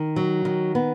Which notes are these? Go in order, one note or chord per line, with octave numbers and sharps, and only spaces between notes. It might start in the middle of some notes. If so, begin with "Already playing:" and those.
Already playing: D#3
F#3
D#3
B3